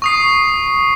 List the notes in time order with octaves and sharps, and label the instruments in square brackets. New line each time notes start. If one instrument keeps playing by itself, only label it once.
[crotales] C#6 D#6 C7